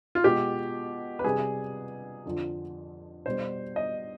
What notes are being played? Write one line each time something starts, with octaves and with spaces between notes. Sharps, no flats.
F4
B2 G#3 G4
B4
C3 G3 G#4
F2 D3 F3
B2 G3 C5
D#5